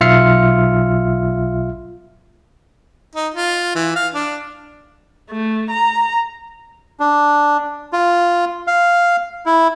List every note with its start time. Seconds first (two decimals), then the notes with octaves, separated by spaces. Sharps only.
0.01 B1 F4 E5 F6 C7 C#7
3.15 D#4
3.34 F4
3.75 E3
3.95 F5
4.14 D4
5.31 A3
5.70 A#5
7.00 D4
7.93 F4
8.67 F5
9.46 E4